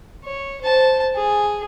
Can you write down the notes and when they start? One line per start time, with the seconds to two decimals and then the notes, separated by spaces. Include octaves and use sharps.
0.25 C#5
0.61 C5 A5
1.15 G#4